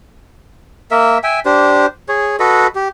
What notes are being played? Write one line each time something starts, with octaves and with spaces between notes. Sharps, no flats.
A#3 A#4 E5
E5 G5 G#5
D4 G4 C5
G#4 C#5
F#4 A4 B4 D#5
G4